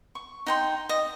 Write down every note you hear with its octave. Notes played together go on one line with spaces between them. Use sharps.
C#6
D#4 G5 C6
D#5